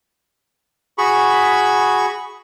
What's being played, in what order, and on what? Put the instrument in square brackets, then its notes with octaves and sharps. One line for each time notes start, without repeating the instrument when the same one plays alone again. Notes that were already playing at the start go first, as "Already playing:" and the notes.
[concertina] F#4 G#4 B5 C#6